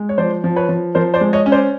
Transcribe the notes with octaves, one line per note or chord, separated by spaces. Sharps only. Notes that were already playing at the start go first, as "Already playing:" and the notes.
Already playing: G#3
C#5
F3 C5 D5
F3
B4 C#5
F3
F3 A#4 C5
C5 D5
G#3
C#5 D#5
C#4
C5 D5